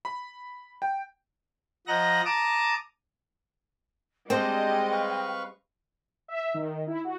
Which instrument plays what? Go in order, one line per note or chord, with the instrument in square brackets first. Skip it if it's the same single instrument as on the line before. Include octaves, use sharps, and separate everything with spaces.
[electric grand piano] B5
G5
[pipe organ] F3 D#5 F#5 A#5 A#6
A5 A#5 D6 D#6
[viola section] G3 G#3 D#5 [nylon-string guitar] C4 [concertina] D4 C5 [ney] G5
[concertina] B4 F5 C#6
[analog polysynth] E5
D#3
E4
F#4